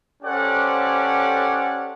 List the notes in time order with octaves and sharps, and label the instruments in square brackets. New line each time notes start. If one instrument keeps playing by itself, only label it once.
[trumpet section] C#4 G4 A4 C5 D5 F#5